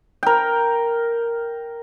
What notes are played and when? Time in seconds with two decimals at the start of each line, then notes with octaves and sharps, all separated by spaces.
0.23 A#4 G5